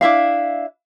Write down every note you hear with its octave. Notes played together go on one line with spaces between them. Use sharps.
D4 E4 E5 F5